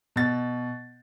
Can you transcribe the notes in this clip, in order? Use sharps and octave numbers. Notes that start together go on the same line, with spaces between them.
B2 A6